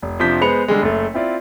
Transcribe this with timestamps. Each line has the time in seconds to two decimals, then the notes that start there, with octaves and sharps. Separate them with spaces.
0.02 F1
0.19 F2 C3 F3 D4 G6 B6
0.41 G#3 B3 C5 B5 C#7 F7
0.68 D3 G3 G#3
0.82 F#1 A3
1.14 C4 E4 F4 D5